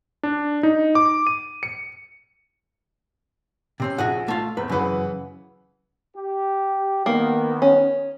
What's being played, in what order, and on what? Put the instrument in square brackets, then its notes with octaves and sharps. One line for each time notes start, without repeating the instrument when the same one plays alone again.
[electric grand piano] D4
D#4
D6
D#7
C#7
[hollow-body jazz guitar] C3 C4 C#4
[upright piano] A#1 [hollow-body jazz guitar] F#4 G#4 F#5
[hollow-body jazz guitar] A3 F4
[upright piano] E2 C4 [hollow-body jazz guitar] B4
[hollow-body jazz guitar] F#2 E3 [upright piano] C#3 B4 F#5
[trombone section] G4
[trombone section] D#3 B3 [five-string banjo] A#3
[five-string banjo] C#4